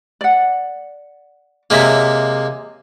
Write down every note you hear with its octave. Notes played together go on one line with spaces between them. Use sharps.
D5 F#5
C3 G#3 A#3 A#4 C#5 E5